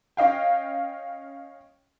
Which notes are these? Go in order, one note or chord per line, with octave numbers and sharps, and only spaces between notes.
C#4 D#5 F5 G5